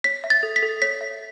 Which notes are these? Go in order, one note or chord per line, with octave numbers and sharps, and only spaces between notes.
C#5 B6
E5
A6
A4
B6
A4
C#5 B6
E5